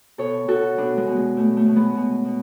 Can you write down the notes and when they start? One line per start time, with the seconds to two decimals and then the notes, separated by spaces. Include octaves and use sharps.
0.18 B2 A4 C#5
0.48 B2 F#4 A4
0.77 B2 B3 D4
0.97 G#3 B3
1.07 B2
1.16 G#3
1.37 B2 A3
1.57 A3
1.66 B2
1.76 G#3 B3
1.95 B2
2.25 B2